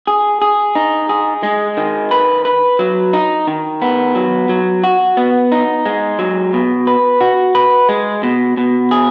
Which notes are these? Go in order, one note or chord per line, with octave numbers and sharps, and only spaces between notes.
G#4
G#4
D#4
G#4
G#3
D#3
B4
B4
F#3
D#4
D#3
B3
F#3
F#3
F#4
B3
D#4
G#3
F#3
B2
B4
F#4
B4
G#3
B2
B2
G#4